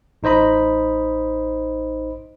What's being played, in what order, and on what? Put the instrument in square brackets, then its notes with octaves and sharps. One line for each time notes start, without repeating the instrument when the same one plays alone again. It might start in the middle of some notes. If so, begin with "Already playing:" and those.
[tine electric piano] A1 D#4 C5 D#5 B5